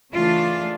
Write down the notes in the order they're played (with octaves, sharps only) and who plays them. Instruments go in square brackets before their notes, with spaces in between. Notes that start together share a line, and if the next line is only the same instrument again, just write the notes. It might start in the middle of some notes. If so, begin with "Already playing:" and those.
[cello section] C#3 E3 A3 D4 F4